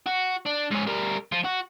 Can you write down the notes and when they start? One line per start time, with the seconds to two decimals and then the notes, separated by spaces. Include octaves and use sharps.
0.06 F#4
0.46 D4
0.71 G#2 C#4
0.87 G3 A#4
1.32 F3
1.45 F#4